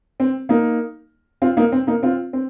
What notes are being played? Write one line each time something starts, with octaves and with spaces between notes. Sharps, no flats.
C4
A#3 D#4
C4 F4
A#3 D#4
C4
A#3 D#4
C4 F4
C4